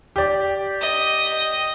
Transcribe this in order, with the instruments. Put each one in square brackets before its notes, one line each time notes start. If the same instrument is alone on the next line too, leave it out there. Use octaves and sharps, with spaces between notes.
[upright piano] G4 D5
[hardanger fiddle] D#5